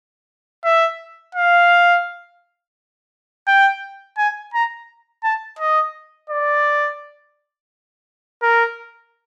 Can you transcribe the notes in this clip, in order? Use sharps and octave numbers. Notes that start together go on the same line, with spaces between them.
E5
F5
G5
G#5
A#5
A5
D#5
D5
A#4